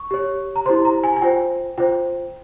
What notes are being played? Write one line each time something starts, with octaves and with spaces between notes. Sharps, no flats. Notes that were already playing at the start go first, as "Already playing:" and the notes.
Already playing: C#6
G4 C#5
A#5
E4 G4 C5 C6
A#5
G#5
G#5
F4 C5 G5
F4 C5 G5